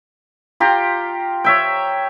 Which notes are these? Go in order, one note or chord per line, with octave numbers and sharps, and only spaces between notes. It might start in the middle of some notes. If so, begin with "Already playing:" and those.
F4 G4 A#5 C6
C#5 E5 G5